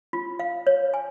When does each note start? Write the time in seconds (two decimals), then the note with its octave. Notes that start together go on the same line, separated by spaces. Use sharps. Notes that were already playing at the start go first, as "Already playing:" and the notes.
0.13 F4
0.39 F5
0.67 C#5
0.94 G#5